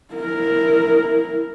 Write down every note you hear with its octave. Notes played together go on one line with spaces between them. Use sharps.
E4 A#4